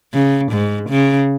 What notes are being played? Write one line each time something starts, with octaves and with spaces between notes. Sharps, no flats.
C#3
G#2
C#3